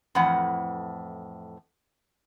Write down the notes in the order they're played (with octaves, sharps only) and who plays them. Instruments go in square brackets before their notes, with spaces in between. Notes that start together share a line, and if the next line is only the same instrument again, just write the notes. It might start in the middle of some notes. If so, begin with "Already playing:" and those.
[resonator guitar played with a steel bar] F2 A2 E3 F#5